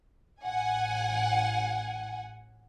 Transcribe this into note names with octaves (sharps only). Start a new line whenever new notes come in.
A1 F#5 G#5